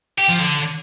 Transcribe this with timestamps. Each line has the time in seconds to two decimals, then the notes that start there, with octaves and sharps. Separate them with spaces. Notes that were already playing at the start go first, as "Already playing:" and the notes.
0.18 G4
0.29 F3
0.39 D3